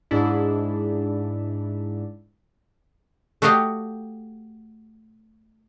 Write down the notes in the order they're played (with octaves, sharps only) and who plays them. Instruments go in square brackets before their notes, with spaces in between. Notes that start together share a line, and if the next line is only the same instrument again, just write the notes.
[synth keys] G#2 D4 E4
[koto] A3 F#4 G4 D#5 F5 G5